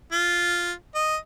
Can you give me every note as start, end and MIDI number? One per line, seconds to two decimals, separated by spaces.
0.12 0.71 65
0.95 1.16 75